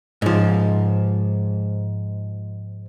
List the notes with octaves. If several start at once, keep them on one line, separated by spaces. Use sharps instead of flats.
G#2 F3